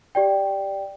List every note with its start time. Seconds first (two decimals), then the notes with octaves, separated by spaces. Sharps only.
0.15 G4 D5 G5